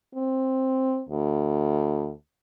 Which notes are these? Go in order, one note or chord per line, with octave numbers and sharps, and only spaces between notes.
C4
D2